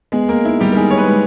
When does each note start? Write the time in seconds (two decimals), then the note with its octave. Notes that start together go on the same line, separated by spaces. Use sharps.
0.12 G#3 B3 G#4
0.29 A#3 A#4
0.44 D#4 E4
0.60 G3 G4
0.72 A#4
0.77 G#3 D#4 G#4
0.90 C#5
0.98 B3 B4
1.08 G#3